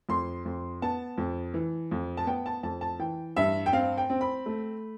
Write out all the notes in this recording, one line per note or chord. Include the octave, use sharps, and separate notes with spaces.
F2 C6
F2
B3 A5
F2
E3
F2
A5
B3 G5
A5
F2 A5
A5
E3 G5
G2 E5
G5
C4 F5
G5
C4
B5
A3